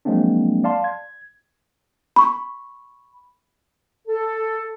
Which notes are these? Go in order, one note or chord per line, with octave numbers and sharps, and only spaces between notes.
F3 F#3 G#3 A#3 C4 D4
D5 F5 A5 C6
G#6
B5 C#6
A4